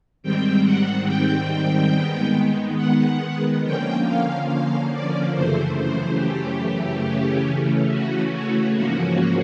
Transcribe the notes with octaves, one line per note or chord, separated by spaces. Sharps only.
G#2 D#3 G3 C4 G5
F#5
G5
D#3 G#3 B3
F#5
D3 F3 A#3 C#4 G5
F5
F5
D5
F#2 C#3 E3 A3 C5
C5
G4
C#3 E3 A3 C#4
F#4
F#4
G#2 F3 A#3 C#4 F#4